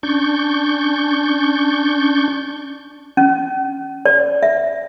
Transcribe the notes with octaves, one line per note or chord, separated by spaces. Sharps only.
C#4 D4 C#6 G6
C#4
D5
E5